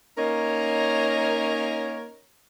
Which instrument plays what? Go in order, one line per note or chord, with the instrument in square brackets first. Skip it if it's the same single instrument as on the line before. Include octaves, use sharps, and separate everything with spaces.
[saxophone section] A#3 C#4 D#4 A#4 C#5 D#5